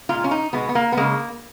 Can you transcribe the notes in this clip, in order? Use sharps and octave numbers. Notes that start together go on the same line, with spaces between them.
A#2 G#3 F4
C#4
D#4
B2 G#3 B3
B3
A#3
B3
C#3 G#3 A#3